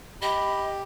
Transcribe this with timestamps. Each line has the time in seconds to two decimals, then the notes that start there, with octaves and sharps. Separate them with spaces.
0.22 G4 D#5 B5